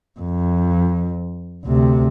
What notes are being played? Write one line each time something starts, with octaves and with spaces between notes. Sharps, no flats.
F2
D2 C3